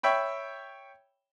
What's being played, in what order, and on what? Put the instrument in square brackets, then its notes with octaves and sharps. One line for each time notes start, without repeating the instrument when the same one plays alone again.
[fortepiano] C#5 E5 G5 B5